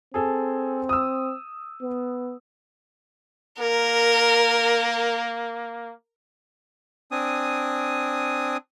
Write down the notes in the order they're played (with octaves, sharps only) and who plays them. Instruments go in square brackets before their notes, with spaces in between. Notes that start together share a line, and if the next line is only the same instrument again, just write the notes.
[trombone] C4 [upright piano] G#4 A4
[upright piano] D#6 E6
[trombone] B3
[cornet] A#3 [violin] A#4
[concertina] C4 D4 G#5 D#6